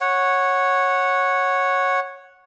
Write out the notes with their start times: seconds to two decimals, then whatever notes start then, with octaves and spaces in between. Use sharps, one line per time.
0.01 C#5 F#5